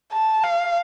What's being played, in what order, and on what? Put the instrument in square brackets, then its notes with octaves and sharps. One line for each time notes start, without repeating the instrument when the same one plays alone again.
[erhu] A5
F5